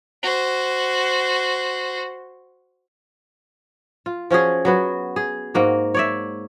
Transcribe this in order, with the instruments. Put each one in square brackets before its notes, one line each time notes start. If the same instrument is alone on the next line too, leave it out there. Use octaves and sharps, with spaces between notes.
[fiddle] F#4 C5
[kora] F4
F3 C#4 F#4 G#4
F#3 B3 F#4
G#4
G#2 A#3 F#4
C#5 D5 E5